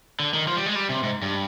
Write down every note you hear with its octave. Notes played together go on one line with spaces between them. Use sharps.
D3
D#3
F3
G3
G#3
G3
C3
G#2
G2